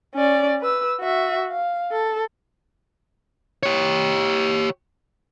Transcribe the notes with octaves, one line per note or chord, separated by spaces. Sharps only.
C#4 D5
B4 E6
F#4 E5
F5
A4
G4 C#5